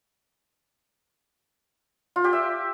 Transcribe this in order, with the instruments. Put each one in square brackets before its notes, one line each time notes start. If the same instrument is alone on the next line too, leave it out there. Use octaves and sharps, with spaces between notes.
[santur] F4
G4
E5